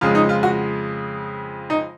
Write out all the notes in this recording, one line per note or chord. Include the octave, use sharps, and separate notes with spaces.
F2 C#3 G#3 F4
D#4
F4
F#4
D#4